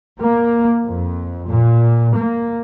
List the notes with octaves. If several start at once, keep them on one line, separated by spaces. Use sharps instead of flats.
A#3
F2
A#2
A#3